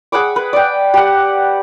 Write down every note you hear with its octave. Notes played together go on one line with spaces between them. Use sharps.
G#4 F#5 B5 D6
B4
D5 G5
G4 F#5